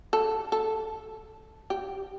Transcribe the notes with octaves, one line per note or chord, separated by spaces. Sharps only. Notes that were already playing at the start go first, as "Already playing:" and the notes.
A4
A4
G4